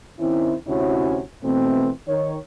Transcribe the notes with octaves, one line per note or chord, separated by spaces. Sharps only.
D#3 C4 C#4 E4
D2 C3 C#4 E4 F#4 C#5
B2 E3 A3 C4
D#3 C#5